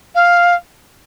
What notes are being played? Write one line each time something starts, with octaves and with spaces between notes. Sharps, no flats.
F5